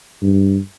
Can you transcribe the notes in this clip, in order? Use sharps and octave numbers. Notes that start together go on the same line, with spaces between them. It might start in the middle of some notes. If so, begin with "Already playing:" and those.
G2